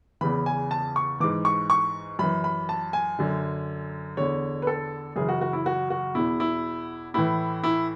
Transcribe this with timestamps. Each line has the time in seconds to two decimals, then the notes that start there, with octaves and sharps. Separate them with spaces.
0.21 E2 C#3 E3 B5
0.46 G#5
0.71 A5
0.96 C#6
1.20 G#2 E3 D6
1.45 C#6
1.70 C#6
2.19 F#2 E3 B5
2.44 B5
2.69 A5
2.93 G#5
3.19 F#2 D3
4.17 E2 D3 C#5
4.62 B4
4.67 A4
5.16 F#2 C#3 E3 G#4
5.29 F#4
5.41 F#4
5.53 E4
5.66 F#4
5.90 F#4
6.15 E2 B2 E4
6.40 E4
7.14 A2 E3 E4
7.64 E4